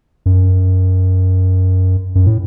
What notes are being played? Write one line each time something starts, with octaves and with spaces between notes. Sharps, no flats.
F#2
F#2
A2